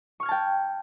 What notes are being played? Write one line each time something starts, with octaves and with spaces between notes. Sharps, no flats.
G5 A5 C#6 F6 G#6